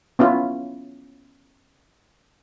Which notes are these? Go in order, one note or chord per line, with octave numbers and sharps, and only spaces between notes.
B3 C#4 E4 F4